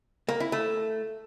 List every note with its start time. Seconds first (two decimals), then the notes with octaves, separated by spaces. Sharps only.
0.29 A#3
0.40 E4
0.52 A3